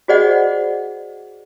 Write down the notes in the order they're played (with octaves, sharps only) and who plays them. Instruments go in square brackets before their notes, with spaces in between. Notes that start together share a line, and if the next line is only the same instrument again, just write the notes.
[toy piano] F#4 G#4 C5 D5 D#5 F#5